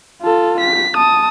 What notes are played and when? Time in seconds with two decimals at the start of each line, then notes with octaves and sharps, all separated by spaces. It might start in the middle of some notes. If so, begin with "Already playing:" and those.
0.22 F4 A4
0.60 B6
0.95 A5 D#6